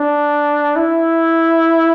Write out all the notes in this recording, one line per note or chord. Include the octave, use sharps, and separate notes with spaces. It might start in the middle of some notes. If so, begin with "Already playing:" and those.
Already playing: D4
E4